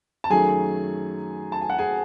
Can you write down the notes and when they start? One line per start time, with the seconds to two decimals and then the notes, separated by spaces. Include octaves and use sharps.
0.24 A5
0.30 F#2 D#3 F#3 A3 G#4 G#5
1.52 A5
1.61 G#5
1.70 F#5
1.79 G#4 G#5